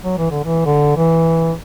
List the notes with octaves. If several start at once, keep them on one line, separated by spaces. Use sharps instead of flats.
F#3
E3
D3
E3
D3
E3